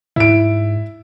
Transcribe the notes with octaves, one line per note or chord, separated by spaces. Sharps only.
G#2 E4 D7